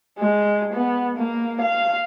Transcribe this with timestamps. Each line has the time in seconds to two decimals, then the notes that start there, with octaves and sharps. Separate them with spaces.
0.19 G#3
0.73 B3
1.17 A#3
1.61 F5